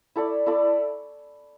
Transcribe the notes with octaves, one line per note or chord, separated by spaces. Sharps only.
E4 A4 D5
E4 A4 D5